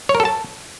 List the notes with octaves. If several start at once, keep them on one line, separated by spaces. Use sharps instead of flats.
C#5
A#4
A4
A5